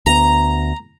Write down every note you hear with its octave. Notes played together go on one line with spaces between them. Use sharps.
D2 B3 A#5